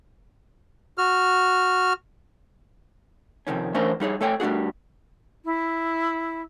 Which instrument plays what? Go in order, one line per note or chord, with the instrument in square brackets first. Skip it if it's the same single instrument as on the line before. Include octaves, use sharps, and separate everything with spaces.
[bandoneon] F#4 F6
[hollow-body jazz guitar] F2 C3 D#3 C#4
E3 A3 C#4 D4 A#4 C5
G3 D#4 G#4 C#5
A3 A4 C#5 G5 G#5
G3 A3 D4 F#4 G#4
[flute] E4